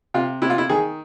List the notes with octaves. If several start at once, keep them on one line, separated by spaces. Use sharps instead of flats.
C3 F4
C3 E4
F4
E4
D#3 G#4